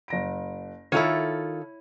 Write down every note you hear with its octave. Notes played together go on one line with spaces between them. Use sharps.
F#1 A#6 D7
D#3 E4 F4 A4 C#5 D#7